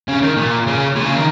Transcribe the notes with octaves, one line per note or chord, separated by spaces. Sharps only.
C#3
D#3
A#2
C#3
A#2
C#3
D#3